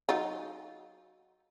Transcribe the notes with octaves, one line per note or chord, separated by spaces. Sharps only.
F#3 D#4 F4